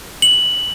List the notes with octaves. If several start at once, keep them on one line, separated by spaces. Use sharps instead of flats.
F#7